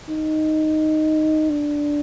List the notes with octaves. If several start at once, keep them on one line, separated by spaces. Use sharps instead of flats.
D#4
D4